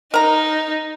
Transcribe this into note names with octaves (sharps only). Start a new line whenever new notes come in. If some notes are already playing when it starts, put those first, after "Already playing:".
D#4 A#4 A#5